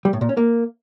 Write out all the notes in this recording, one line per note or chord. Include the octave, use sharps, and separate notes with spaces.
G3
A2
A#2
C#4
A#3